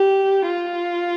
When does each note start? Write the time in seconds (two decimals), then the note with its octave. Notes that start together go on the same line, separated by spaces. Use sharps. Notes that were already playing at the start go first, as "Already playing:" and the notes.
Already playing: G4
0.46 F4